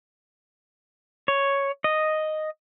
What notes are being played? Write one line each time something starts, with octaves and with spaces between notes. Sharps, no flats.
C#5
D#5